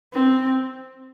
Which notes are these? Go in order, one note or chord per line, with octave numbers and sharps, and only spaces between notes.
C4